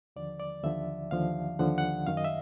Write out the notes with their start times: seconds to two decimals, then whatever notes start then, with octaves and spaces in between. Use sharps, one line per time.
0.16 D#2 D3 F3 D5
0.40 D5
0.64 D#2 D3 F3 E5
1.11 D#2 D3 F3 F5
1.59 D#2 D3 F3 F#5
1.78 F#5
2.07 F#2 D#3 F5
2.17 D#5
2.24 E5